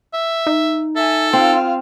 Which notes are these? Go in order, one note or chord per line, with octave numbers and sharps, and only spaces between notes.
E5
D#4
A4 E5 G#5
C4 F4 F5